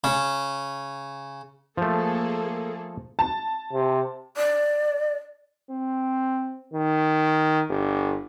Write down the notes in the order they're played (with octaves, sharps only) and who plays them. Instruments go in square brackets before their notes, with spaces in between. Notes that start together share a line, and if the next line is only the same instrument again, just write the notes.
[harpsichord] C#3
[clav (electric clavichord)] F3 A3 [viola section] A#3 G#4 A4
[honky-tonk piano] A5
[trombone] C3
[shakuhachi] D5
[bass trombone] C4
D#3
G1